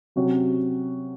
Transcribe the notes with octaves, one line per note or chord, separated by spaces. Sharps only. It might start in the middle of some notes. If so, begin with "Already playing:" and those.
C3 F#3 C#4 F#4